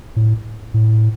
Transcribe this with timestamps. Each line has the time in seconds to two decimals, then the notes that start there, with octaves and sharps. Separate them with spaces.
0.16 A2
0.74 A2